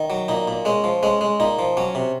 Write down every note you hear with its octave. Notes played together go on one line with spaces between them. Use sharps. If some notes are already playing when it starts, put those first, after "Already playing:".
Already playing: D#3
F#3
A#2 D#4
A#2
G#3 C#4
F3
G#3 C#4
G#3
A#2 D#4
F3
F#3 C#4
C3